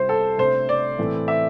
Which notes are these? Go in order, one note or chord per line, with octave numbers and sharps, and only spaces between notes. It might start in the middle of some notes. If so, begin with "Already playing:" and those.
Already playing: C3 G3 E4 C5
A4
C3 A3 D4 C5
D5
A2 E3 A3 C4
E5